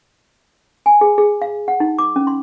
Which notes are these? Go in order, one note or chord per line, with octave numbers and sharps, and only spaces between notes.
G#5
G#4
G#4
F5
F#5
D#4
D6
C#4
C6